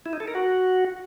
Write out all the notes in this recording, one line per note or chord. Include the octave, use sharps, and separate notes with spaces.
E4
D#4
A4
A#4
F#4